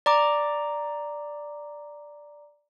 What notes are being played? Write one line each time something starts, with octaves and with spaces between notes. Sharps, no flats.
D5 A#5 D6